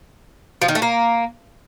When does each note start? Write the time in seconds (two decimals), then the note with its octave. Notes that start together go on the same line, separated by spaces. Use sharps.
0.62 F3
0.68 D#3
0.75 A3
0.82 A#3